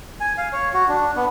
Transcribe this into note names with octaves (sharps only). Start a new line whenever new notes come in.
G#5
F5
C#5
F#4
D4
B3